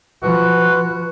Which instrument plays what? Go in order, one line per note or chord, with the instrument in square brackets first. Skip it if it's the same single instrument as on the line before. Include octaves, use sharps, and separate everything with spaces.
[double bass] F3 [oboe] F#4 [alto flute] B4